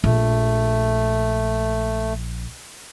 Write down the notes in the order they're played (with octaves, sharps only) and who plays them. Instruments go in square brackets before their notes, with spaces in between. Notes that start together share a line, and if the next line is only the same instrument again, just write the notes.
[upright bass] A#1 [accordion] A3